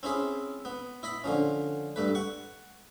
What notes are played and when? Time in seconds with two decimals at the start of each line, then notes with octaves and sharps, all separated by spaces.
0.03 C4 C#4 E4 G#4
0.65 B3
1.03 E4 D#5 B5
1.24 D3 F3 C#4
1.96 G2 A3 B4
2.15 F#5 C#6